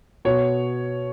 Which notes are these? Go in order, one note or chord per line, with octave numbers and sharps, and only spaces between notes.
B2 C#5